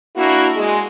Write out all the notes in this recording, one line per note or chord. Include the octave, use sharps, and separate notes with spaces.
A#3 D4 E4 F#4
G#3